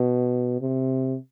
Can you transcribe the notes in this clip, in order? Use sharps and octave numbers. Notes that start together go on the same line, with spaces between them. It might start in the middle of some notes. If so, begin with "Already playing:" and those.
Already playing: B2
C3